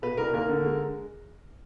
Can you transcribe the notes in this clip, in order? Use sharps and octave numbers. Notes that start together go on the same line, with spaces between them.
B2 B4
C2 A#4
D#2 A#4
D3
G#3